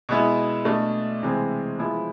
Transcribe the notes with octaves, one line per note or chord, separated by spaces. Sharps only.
B2 G#3 B3 E4
B2 A3 D4
C3 E3 G#3 C4
F3 G#3 B3 E4